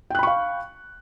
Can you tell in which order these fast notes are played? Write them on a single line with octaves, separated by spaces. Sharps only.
G5 F#6 B5 C#6 F5